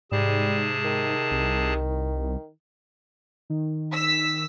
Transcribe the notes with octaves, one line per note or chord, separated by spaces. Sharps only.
G#2 C3 G3 G#4 A5
D#3
C2
D#3
E6 B6